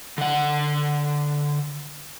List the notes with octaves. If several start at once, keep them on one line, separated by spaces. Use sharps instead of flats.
D3 F#5